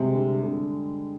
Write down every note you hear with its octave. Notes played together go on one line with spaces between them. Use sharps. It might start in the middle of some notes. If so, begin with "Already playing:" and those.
Already playing: C3 G3 G#3
D3
D3